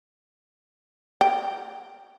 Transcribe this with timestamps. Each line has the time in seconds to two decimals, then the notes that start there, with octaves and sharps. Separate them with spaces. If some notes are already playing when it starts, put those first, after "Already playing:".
1.21 G5